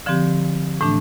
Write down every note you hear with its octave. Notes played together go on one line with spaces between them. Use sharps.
D3 F3 C4 G4
A2 E3 A3 D4